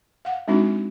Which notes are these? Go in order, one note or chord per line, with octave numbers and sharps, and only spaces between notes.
F5 F#5
G#3 C4 D4 D#4 F#4